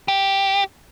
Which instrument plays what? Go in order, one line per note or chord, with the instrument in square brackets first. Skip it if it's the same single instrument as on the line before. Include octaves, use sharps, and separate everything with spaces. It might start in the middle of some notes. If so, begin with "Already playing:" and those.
[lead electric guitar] G4